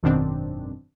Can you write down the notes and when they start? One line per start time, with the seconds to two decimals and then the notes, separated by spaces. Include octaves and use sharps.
0.03 G#1 F#2 B2 D#3 C4 D4